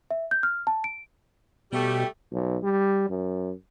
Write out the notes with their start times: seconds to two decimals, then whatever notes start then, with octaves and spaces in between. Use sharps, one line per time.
0.11 E5
0.31 G6
0.43 F6
0.67 A5
0.84 D7
1.72 B2 G3 A3 G4
2.32 B1
2.63 G3
3.10 F#2